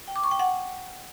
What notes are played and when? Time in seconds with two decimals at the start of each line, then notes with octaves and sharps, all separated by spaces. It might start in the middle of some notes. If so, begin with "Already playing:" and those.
0.08 G5
0.16 D6
0.24 C#6
0.31 G5
0.39 F#5